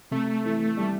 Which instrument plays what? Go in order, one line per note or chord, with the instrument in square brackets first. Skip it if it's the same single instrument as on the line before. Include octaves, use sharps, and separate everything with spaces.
[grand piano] C3 [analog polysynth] A3
[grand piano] E3
G3